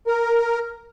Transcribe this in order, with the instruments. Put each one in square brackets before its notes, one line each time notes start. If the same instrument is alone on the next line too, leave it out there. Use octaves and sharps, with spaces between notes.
[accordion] A#4